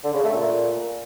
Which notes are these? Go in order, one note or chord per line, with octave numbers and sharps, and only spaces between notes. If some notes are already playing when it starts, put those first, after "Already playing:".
D3
C#3
A3
A#2